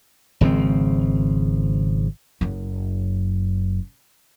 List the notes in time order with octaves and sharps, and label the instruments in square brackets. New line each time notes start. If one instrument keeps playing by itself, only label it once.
[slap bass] G#1 C#3 F3 C4
[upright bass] F#1 F#2